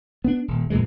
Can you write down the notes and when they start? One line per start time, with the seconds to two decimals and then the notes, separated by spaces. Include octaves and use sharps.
0.24 B3 D4
0.48 D#1
0.70 F2 A#2 E3 G#3